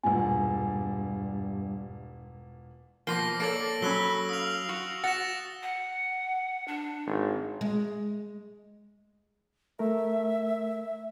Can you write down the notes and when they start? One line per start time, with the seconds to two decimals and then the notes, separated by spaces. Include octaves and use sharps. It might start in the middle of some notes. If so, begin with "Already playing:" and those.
0.04 E1 G2 A#2 G#5
3.07 B2 F3 A#3 A#6 C7 G7
3.40 A#3 A4 C#5 D5 D7 F#7
3.82 F#3 C#4 B5 E6 F#6 G7
4.29 F5 D#6 F7
4.69 F#4
5.04 F#5 A6 A#6 E7
5.63 F#5
6.68 D4
7.07 G#1
7.61 G#3
9.79 A3 A#4 E5